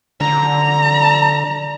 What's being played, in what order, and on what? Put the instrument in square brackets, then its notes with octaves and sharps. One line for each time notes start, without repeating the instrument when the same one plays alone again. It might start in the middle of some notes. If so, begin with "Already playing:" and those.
[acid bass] D3 [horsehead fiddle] A#5